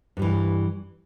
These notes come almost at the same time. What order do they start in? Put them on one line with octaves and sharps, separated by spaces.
G2 G3 E3